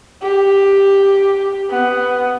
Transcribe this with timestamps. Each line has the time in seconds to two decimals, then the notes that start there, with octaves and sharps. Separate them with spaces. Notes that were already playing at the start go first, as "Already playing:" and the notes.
0.22 G4
1.70 B3